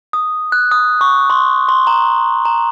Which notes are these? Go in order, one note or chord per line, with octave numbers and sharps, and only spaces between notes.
D#6
F#6
D#6
C#6
C6
C6
A#5
A#5